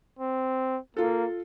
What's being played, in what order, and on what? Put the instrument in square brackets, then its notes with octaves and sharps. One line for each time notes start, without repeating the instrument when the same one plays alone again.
[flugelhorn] C4
[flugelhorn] A#3 [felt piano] F4 A4